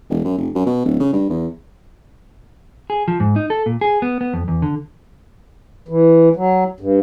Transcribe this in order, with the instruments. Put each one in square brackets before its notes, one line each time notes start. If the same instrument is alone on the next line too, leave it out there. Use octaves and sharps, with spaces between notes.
[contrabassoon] E1
F#2
F1
F#2
B2
D1
C#3
G2
E2
[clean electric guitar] G#4
F3
G#2
D#4
A4
A#2
G#4
B3
B3
F2
E2
D3
[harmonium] E3
F#3
G2